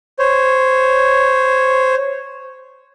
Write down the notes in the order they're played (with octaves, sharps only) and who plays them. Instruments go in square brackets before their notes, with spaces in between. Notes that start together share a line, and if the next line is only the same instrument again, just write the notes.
[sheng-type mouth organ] C5 C#5